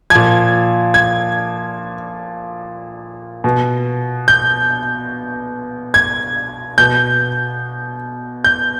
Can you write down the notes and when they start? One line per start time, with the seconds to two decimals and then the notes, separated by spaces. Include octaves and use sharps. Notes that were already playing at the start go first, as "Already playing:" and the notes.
0.10 A#2 F3 G#6
0.94 G#6
3.44 B2
4.28 G6
5.94 G#6
6.78 B2 G6
8.44 G6